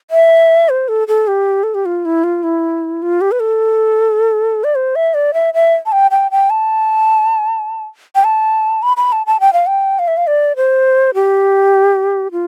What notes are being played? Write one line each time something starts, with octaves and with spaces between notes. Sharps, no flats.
E5
C5
A4
A4
G4
A4
G4
F4
E4
F4
E4
F4
G4
B4
A4
D5
C5
E5
D5
E5
E5
A5
G5
G5
G5
A5
G5
A5
B5
B5
A5
A5
G5
F5
G5
F5
E5
F5
D5
C5
G4
F4